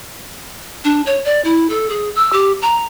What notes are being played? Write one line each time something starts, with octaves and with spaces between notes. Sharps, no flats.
D4
C#5
D5
E4
A4
G#4
E6
G4
A#5